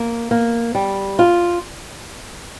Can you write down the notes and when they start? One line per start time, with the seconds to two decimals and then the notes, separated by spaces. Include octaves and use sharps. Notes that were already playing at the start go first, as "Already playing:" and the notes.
Already playing: A#3
0.31 A#3
0.75 G3
1.19 F4